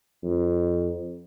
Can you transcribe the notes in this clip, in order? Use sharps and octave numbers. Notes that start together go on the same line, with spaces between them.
F2